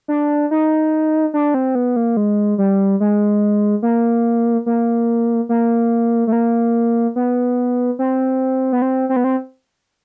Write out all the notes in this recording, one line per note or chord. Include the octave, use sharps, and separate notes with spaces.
D4
D#4
D4
C4
B3
A#3
G#3
G3
G#3
A#3
A#3
A#3
A3
A#3
B3
C4
B3
C4
C4
B3
C4